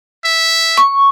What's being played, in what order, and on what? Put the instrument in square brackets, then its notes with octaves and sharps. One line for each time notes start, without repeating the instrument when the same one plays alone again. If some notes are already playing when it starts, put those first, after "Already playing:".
[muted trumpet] E5
[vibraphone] C#6